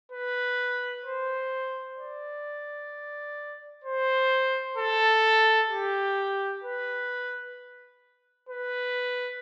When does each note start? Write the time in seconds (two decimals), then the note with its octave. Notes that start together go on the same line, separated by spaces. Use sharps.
0.12 B4
1.04 C5
1.97 D5
3.84 C5
4.77 A4
5.70 G4
6.64 B4
8.49 B4